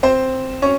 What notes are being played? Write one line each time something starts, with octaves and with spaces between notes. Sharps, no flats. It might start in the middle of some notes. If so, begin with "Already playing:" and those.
C4 C5
C#4 C#5